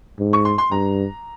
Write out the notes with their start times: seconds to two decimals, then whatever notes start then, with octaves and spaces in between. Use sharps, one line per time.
0.19 G#2
0.33 C#6
0.45 C6
0.58 C6
0.71 G2 A#5